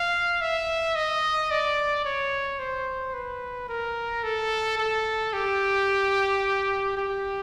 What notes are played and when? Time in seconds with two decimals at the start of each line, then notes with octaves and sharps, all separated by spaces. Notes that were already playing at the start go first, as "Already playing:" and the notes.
Already playing: F5
0.41 E5
0.95 D#5
1.51 D5
2.05 C#5
2.59 C5
3.14 B4
3.69 A#4
4.23 A4
4.78 A4
5.33 G4
6.97 G4